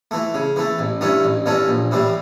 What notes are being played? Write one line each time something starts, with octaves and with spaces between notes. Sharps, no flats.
E3 A3
C#3
E3 A3
A1
G2 E3 A3 C#4
A1
G2 E3 A3 C#4
A#1
A2 E3 G3